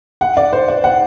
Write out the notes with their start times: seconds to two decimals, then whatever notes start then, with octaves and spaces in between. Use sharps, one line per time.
0.21 F#5
0.37 D5
0.53 C5
0.68 D5
0.84 F#5